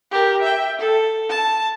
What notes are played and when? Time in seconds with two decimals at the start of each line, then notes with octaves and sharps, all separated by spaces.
0.11 G4 A#4
0.42 E5 G5
0.79 A4
1.29 A5